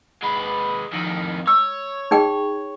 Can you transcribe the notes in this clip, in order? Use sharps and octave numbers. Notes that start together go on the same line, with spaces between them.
G#3 B4
F2 D#3
C#5 E6
D#4 G#4 G5